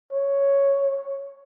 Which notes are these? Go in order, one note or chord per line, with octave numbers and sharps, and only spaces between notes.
C#5